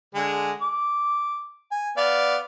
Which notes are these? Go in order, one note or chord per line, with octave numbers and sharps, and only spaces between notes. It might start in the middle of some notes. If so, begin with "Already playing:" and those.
D3 G#3
D6
G#5
B3 D5 F5